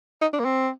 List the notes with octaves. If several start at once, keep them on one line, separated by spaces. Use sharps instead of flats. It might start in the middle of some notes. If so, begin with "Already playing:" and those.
D#4
D4
A#3
C4